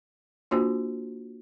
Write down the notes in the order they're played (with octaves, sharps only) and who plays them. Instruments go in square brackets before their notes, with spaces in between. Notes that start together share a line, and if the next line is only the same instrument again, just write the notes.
[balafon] A#3 D4 F4 F#4 C5